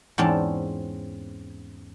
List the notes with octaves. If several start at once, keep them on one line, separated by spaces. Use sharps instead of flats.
E2 G#2 C4 C#4 D5 A5